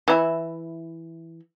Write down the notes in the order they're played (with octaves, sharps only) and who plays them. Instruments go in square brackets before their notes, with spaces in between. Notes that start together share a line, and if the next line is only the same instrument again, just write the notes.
[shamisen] E3 E4